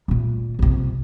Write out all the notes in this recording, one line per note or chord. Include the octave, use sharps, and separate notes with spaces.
A#2 A3
A#1 C3